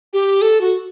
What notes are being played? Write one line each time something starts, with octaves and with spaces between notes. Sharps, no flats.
G4
A4
F#4